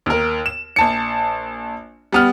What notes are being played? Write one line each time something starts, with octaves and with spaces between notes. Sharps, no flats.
D#2 A#4
E7
A#1 A5 C#7
G3 B3 F6